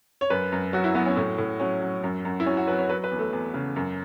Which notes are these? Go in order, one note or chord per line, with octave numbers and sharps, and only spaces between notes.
C#5
F#2 B4
F#2
F#3 F#4
E4
F#3 B3
C#4
A2 C#4
A2
F#3 C#4
F#3
F#2
F#2
E4
F#3 C#4
F#4
F#3 B4
C#5
F#3 B4
B4
E2
A3
E2
C#3
F#2